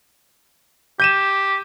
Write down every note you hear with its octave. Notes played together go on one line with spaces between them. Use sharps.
G4 G6 D#7 E7